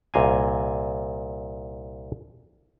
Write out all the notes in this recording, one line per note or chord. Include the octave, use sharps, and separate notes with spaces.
C2 A#2 D#5 F5 G#5